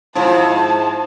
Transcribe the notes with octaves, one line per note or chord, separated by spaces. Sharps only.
G#2 F3 E4 A5